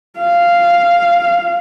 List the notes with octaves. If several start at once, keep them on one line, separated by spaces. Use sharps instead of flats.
F5